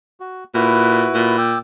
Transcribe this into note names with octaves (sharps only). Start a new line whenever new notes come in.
F#4
A#2 E4 F#4 B4
A#2
G5 D6 E6